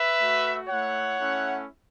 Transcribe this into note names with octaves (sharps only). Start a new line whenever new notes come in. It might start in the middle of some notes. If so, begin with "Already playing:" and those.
Already playing: B4 E5
A3 F#4
A3 E4 C#5 F#5
A3 C#4 E4